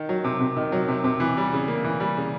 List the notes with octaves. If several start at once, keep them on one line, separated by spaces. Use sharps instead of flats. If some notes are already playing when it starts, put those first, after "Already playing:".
Already playing: D#3
F#3
C3
C3
D#3
F#3
C3
C3
E3
G3
C#3
A#3
E3
G3
C#3